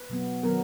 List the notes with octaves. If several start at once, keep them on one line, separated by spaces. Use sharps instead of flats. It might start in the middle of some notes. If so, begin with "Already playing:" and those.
Already playing: B4
B2 F#3 B3
D#3 F#3 B3 A#4